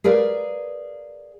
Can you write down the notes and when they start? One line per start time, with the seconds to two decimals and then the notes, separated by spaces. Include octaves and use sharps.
0.04 G#4 A#4 B4 D5 F5